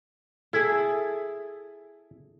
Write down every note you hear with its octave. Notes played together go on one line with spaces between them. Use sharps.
E4 G#4 A4